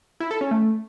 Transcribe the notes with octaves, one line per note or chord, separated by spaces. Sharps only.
E4
A4
C#4
A3